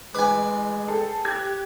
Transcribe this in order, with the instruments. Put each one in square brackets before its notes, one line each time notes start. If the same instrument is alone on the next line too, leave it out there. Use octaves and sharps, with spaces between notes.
[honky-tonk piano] A1 D6 [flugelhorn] G#3 [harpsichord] B4 G#5
[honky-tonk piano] G#4 A4 G5
[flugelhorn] G4 [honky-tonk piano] F#6 G#6